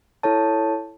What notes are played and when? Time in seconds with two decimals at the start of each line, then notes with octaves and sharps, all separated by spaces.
0.23 E4 A4 C#5 A5